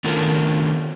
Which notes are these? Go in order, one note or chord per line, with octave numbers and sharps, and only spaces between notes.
D#3 A3 B3 C#4 D4 F4